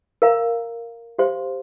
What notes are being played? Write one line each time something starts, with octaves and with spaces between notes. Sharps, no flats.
A#4 F5 A#5
G4 C5 F5 C6